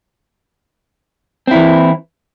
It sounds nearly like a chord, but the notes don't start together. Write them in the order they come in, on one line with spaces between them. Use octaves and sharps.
C4 E4 E3